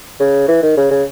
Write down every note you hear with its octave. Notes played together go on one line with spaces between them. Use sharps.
C#3
E3
D#3
C#3
C#3